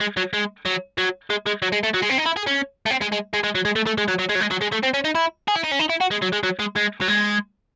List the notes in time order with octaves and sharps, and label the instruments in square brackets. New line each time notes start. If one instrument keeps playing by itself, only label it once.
[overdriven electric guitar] G#3
F#3
G#3
F#3
F#3
G#3
G#3
F#3
G#3
A3
F#3
G#3
C4
D#4
E4
G#4
C#4
A3
C4
G#3
G#3
G#3
G#3
F#3
G#3
A3
A3
G#3
F#3
F#3
G#3
F#3
G#3
F#3
G#3
A3
C4
C#4
D#4
E4
G#4
E4
D#4
C#4
D#4
E4
F#4
G#3
F#3
G#3
F#3
G#3
G#3
F#3
G#3